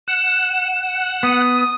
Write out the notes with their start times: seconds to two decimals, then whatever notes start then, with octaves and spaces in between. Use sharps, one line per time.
0.08 F#5 E7
1.23 B3 D#6